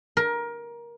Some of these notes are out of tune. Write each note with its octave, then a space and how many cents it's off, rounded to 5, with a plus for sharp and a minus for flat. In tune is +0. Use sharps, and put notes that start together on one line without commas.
A#4 +20